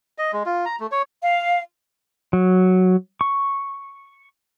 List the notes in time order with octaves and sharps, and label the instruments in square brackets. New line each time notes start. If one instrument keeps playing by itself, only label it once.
[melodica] D#5
G#3
F4
A#5
A3
C#5
[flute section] F5
[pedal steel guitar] F#3
C#6